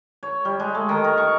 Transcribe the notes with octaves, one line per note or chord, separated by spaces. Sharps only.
C#5
G3
G#3
A3
D#3
A#4
C#6